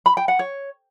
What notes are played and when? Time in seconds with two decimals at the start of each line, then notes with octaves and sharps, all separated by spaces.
0.06 B5
0.17 G5
0.28 F#5
0.39 C#5